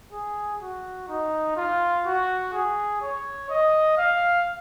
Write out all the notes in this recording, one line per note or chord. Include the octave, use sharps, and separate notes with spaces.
G#4
F#4
D#4
F4
F#4
G#4
C#5
D#5
F5